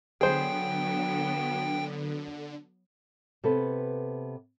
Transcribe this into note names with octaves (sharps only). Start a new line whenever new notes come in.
D3 F#3 B3 G#4 C5 G5
C3 B3 A4 B4